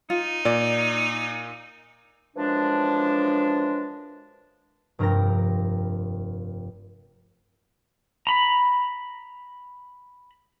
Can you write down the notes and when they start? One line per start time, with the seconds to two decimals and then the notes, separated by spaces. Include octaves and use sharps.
0.10 D#4 F4
0.45 A#2 D5
2.36 F#2 E3 F3 G#3 D4
4.99 F1 G2 A#4 G5 A#6
8.27 A#5 B5